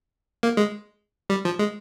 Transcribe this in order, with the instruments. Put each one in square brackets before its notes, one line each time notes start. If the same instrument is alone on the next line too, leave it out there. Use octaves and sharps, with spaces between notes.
[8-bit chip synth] A#3
G#3
G3
F3
G#3